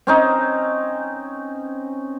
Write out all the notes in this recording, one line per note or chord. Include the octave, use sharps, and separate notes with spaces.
C4 C#4 D#4